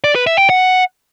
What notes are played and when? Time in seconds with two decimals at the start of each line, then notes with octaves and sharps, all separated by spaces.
0.04 D5
0.15 B4
0.27 E5
0.38 G5
0.49 F#5